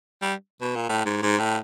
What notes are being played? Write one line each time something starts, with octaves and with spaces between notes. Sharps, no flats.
G3
B2
A#2
A2
G#2
G#2
A2